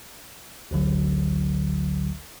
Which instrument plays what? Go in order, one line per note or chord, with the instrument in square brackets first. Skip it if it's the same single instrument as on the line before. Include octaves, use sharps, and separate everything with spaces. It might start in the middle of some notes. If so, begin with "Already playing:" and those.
[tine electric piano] G#1 D2 D3 F#3